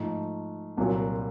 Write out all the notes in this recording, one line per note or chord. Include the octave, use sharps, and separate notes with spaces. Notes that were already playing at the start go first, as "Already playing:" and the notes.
Already playing: G#2 F3 A3
C2 A#2 F#3